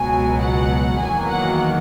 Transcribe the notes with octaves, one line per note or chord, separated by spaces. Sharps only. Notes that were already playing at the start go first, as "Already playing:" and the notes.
Already playing: C#2 B2 F#3 G#5
F#5
E2 D#3 F#3 A#3 G#5
F#5